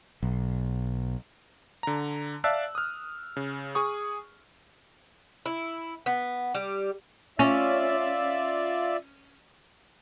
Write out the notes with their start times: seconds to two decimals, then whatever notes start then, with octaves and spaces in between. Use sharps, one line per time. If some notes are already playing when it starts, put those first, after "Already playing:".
0.23 B1
1.83 D3 A#5
2.44 D5 E5 F5 A5 E6 F#6
2.75 D#6 F6
3.37 C#3
3.75 G#4 C#6 D#6
5.46 E4
6.06 B3
6.55 G3
7.39 C#4 F4 D5 E5